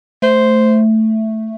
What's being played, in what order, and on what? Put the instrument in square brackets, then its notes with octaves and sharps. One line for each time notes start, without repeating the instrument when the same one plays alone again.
[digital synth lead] A3 [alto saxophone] C5